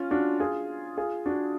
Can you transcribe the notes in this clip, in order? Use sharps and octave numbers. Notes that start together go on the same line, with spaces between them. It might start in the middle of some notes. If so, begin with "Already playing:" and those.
Already playing: C#4 F4
D4 F#4
F4 G#4
F4 G#4
D4 F#4